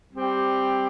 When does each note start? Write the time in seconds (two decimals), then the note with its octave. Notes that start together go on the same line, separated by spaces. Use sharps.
0.13 G3 C4 G4